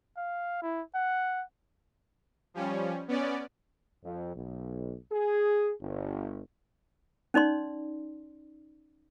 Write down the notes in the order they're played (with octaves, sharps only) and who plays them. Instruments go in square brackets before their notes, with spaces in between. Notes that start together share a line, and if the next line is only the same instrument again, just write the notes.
[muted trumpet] F5
E4
F#5
[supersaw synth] F3 G3 C#4
B3 C#4 D5
[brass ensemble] F2
B1
G#4
G1
[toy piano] C#4 D#4 D5 C6